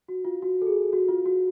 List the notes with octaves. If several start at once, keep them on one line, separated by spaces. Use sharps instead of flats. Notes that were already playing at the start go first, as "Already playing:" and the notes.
F#4
F4
F#4
A4
G#4
F#4
F4
F#4